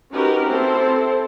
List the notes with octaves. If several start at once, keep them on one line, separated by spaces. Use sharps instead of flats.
C#4 D#4 F#4 G4 A#4 B4
C4 E4 A4 C5